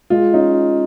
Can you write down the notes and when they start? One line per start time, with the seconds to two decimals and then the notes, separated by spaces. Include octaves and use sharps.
0.10 G#3 F4
0.33 C#4 D#4